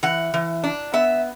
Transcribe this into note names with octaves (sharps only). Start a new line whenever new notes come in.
E3 F#5
E3
D4
B3 E5